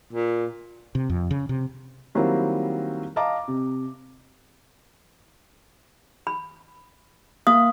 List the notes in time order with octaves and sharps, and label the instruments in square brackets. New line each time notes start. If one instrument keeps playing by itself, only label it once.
[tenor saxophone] A#2
[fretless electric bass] C3
F2
C#3
C3
[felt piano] D#3 F#3 G3 A#3 C4 E4
D#5 F5 A5 A#5 D6
C3
[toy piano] B5
[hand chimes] A#3 F5 [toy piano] D#6